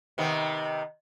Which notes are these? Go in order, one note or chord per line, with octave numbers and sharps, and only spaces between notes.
C3 D#3 B3